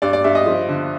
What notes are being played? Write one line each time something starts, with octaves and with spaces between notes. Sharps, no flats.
G2 D5
D5
G2 E5
D#5
F3
D3